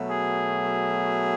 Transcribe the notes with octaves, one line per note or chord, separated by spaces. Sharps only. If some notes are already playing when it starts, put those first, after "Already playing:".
Already playing: B2 F#3 A3
G#4